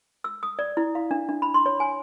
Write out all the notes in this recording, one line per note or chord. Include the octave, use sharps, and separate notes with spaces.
E6
D#6
D5
E4
F5
D4
D4
B5
C6
C#5
G#5